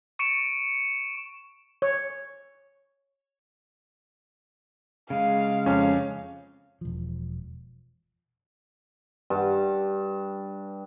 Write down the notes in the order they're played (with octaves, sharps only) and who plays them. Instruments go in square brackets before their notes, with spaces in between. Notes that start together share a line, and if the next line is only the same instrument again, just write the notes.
[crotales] C#6 C#7 D7 E7
[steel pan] C#5
[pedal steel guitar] C#3 G#3 [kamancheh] F5
[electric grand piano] F2 C#4 [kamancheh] F5
[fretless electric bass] E1 F3
[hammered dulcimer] G2 A5